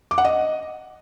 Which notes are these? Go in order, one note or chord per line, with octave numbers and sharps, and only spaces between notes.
D6
F#5
D#5